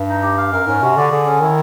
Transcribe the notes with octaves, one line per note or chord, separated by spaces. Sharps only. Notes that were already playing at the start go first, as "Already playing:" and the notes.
Already playing: G2
D#4
G4
F5
F#2 A#4
G#2 C#4
C3 F#4
D3 D5
D3 G#4
C#4
D#3 E4